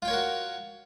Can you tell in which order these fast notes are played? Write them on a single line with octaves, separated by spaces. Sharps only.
F4 G5 C#5 A#4 F#4